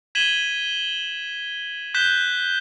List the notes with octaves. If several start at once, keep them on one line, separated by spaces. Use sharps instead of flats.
G#6 B6 D#7 E7 F#7 G7
F#6 G6 B6 E7 G7